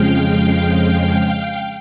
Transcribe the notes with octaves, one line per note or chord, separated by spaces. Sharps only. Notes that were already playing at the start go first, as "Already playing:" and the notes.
Already playing: F2 C#3 F3 G#3 F5 G5